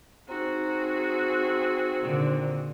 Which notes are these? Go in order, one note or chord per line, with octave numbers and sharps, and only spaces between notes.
C4 D#4 F#4 G#4 A#5
A#2 D3 D#3